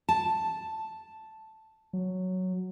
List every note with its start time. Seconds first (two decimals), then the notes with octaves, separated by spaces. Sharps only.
0.09 A5
1.93 F#3